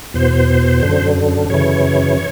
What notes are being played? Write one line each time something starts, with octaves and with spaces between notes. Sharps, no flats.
E2 B2 C5
F#2 D3
F#2 C#3 E3 C#5